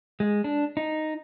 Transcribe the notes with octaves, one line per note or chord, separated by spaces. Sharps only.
G#3
D4
D#4